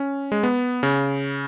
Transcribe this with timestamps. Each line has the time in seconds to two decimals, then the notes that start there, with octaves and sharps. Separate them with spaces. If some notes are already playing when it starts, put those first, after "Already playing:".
Already playing: C#4
0.32 G#3
0.43 B3
0.83 C#3